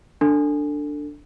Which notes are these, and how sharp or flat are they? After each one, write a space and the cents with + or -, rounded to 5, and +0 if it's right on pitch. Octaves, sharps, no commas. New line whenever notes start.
D4 +0 A4 +25